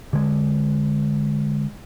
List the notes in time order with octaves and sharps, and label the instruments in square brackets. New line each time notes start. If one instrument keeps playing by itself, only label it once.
[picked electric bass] D3 G#3